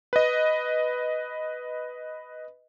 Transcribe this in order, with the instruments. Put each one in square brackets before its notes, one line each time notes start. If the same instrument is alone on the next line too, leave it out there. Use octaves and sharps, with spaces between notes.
[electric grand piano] B4 D#5